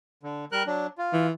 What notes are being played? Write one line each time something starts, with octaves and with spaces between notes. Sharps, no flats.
D3
G3 A#4 F#6
F#3 D4
F4
E3